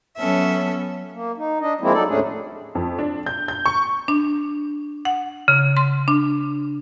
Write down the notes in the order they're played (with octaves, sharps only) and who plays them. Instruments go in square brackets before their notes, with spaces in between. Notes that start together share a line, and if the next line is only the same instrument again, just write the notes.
[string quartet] F#3 B3 C#4 A4 E5
[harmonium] A#3
D#4
D4 D#5
F3 G#3 A#3 C4 E4
F#3 D#4 A4 D5
D#2 A2 A3 C#4 D4 G#4
[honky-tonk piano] F2
D4
G6
G6
C#6
[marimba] D4
F#5
C#3
C6
D4